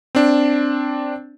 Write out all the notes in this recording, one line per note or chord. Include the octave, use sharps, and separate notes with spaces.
C4 D4